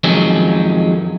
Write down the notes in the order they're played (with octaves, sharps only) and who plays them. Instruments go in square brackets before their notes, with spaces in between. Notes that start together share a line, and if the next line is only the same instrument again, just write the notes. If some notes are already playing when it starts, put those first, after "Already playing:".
[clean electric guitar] F2 D#3 F#3 G#3 C#4